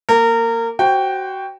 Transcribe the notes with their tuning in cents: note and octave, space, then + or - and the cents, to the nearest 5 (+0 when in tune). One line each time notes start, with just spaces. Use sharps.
A#3 +0 A#4 -25
F#4 +25 C5 +5 G5 +0